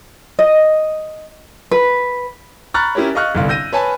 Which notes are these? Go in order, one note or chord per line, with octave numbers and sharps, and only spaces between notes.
D#5
B4
A#5 B5 C#6 F6 F#6 A6
C#4 E4 G4 A#4 C#5
D#5 F5 C#6 F6 F#6
G1 C2 F5
E6 G6 A#6 D#7
B4 C#5 G#5 A5 B5